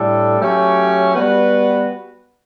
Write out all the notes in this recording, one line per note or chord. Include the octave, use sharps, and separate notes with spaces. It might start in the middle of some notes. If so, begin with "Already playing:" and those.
Already playing: A2 G3 D4 A4
F#3 A3 C#4 G4
G3 B3 F#4 B4